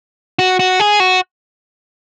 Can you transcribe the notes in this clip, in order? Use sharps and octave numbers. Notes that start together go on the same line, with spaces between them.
F#4
F#4
G#4
F#4